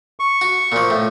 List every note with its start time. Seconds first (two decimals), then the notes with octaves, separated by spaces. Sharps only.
0.20 C#6
0.41 F#4
0.72 A#2 F3
0.90 A2